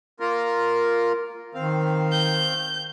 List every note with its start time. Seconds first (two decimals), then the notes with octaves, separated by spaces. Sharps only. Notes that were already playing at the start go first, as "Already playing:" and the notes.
0.20 A#3 F4 A#4
1.55 D#3 C4 F5
2.12 G6